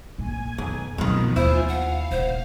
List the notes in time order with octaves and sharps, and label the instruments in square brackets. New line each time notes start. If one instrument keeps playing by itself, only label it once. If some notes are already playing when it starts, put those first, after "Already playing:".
[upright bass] A#1 A#3 [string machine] G#5
[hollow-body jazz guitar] B1 [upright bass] F2 D#3
[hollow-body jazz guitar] F2 D#3 [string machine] B2 F3 [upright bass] F#3 D#4
[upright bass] D#2 [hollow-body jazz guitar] E4 [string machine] F4 G#5 [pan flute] C5
[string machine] F5 [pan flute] F#5
[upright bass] D#1 [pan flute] C5